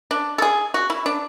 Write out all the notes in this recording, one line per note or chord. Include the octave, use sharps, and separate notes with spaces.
D4
A4
G#4
F#4
E4
D4